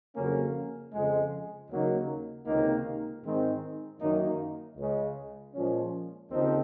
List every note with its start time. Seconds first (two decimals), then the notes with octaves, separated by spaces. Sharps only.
0.16 F2 C#3 F#3 A#3 C#4
0.93 F2 C#3 G#3
1.70 D#2 C#3 F#3 A#3 D#4
2.46 C#2 C3 D#3 A#3 D#4
3.23 G#2 D#3 G#3 C4
4.00 F#2 D#3 A#3 D#4
4.77 C#2 C#3 G#3
5.54 A#2 F3 G#3 C#4
6.30 D#2 C#3 F3 C4 D#4